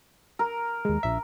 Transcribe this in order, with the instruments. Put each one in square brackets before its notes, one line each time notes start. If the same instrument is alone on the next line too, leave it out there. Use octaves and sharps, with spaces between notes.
[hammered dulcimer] A#4
[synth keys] D#2 G#3
A#1 E5